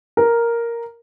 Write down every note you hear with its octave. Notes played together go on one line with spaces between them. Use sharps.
A#4